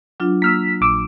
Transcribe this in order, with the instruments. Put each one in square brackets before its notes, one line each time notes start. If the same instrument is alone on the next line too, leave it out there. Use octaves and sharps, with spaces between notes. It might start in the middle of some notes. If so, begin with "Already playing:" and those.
[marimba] F#3 D4 F4
[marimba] A#3 [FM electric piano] E6 F6 B6
[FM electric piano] A#1 D6 E6